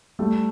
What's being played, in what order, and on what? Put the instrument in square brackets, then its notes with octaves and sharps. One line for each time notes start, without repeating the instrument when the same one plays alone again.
[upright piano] G3 A3